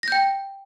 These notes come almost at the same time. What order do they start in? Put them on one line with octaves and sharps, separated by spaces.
A#6 G6 G5